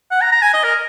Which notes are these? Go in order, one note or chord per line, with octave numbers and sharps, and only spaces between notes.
F#5
A#5
A#5
G#5
D#5
A#4